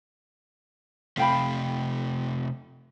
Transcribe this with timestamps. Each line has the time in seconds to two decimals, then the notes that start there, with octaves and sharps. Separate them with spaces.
1.17 C3 A3 F5 G5 B5